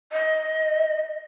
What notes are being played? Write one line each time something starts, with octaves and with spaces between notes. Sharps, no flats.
D#5